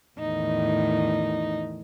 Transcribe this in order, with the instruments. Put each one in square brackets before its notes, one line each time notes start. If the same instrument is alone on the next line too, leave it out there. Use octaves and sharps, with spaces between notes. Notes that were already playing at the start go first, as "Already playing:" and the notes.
[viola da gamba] E2 A2 D#3 [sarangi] D#4